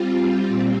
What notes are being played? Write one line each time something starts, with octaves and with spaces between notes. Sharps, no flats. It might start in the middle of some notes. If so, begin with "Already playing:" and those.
Already playing: G3 C4 F4
A#2 G3 C4